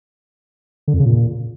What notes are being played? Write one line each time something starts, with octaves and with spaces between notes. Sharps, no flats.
D3
F2
C#3
A#2